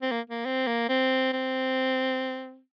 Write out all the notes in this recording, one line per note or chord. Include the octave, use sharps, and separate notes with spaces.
C4
A#3
A#3
C4
A#3
C4
C4